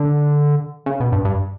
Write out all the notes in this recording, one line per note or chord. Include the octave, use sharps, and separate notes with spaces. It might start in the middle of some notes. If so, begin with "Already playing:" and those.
Already playing: D3
C#3
B2
G2
G2